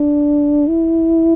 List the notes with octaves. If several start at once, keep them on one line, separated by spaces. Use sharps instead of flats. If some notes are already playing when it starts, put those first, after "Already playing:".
Already playing: D4
E4